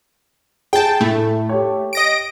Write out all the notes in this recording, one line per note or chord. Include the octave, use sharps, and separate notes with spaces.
G#4 G5 A5
A2 A3
G4 C#5
D#5 A#6 D7